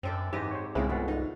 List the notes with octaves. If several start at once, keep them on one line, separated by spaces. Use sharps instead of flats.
F#2 C4 D4 A4
G#2 E3 G4 C5 D#5
C5 C#5
C2 C#3 G#3 C4 E4
G1 B2 F3 F#4 F#5
D#4